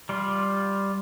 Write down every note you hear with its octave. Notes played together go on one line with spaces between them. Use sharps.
G3 F4